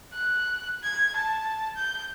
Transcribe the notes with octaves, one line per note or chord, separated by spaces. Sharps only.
F#6
G#6
A5
G6